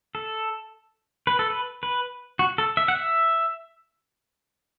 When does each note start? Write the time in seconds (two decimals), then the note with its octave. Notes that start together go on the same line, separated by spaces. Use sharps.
0.15 A4
1.27 B4
1.39 A4
1.50 B4
1.83 B4
2.39 F#4
2.58 A4
2.77 E5
2.88 F#5
2.95 E5